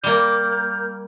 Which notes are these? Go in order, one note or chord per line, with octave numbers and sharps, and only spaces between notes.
G3 A#3 F6 G6